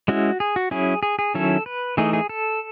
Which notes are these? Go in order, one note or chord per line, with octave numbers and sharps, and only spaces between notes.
G#3 C#4 E4 F#4
G#4
F#4
F#3 C#4 E4 G#4
G#4
G#4
D#3 F#3 C#4 E4 A4
B4
E3 A3 D#4 G#4
G#4
A4